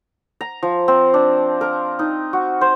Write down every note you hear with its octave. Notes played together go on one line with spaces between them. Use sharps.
A#5
F3
C4
D4
A#4
D#4
F#4
C5